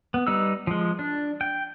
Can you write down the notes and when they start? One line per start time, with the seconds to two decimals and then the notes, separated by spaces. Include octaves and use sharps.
0.14 B3
0.27 G3 D#4 B4 E6
0.67 F3 G#3
0.99 D4
1.41 G5